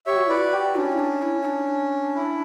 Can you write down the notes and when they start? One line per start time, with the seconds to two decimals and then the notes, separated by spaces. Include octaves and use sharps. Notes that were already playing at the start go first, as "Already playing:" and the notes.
0.06 G4 C#5 E5
0.16 F#4
0.27 E4 B4 D5
0.37 F#4
0.52 G4
0.76 C#4 D4
0.91 E4
0.99 D4
1.22 E4
1.41 E4
1.45 D4
2.15 E4